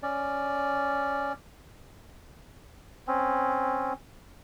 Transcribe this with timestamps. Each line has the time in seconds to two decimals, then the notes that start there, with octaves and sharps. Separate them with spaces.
0.03 C#4 D5
3.08 C4 C#4